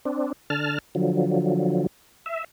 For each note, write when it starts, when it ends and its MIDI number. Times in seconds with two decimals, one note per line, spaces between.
0.05 0.33 60
0.05 0.33 62
0.50 0.79 50
0.50 0.79 81
0.50 0.79 89
0.95 1.87 50
0.95 1.87 53
0.95 1.87 54
2.26 2.44 76